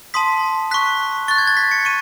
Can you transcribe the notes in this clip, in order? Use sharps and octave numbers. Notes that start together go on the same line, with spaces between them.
A5 C6 D#6 B6
C#6 F#6 B6
C#6 F#6 A6
G#6
A6
B6
C#7
C#6 D#7